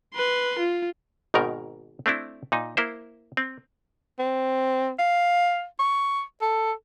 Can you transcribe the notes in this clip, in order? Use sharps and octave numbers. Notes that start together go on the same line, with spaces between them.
B4 C6
F4
G#1 G#2 B2 D#3 A#4
A3 C4 D4 E4
A#2 D#4
A#3 E4 C5
C4
C4
F5
C#6
A4